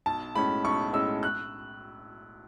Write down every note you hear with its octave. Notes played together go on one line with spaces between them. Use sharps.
B1 A5
A2 G#3 C#4 B5
B1 C#6
A2 G#3 C#4 E6
F#6